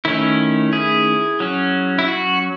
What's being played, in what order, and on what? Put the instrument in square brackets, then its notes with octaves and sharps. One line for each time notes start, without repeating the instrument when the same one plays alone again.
[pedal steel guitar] D#3 A3 C#4 E4
E4 G#4
F#3 C#4
E4
F#4